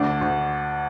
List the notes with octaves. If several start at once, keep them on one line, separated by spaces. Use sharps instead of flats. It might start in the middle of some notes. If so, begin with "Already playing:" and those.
Already playing: D2 D4
D2